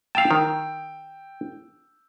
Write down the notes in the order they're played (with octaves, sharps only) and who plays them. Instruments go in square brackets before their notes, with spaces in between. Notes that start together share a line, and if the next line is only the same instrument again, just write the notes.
[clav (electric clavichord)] F5 A5 [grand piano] G5 E6
[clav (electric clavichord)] D#3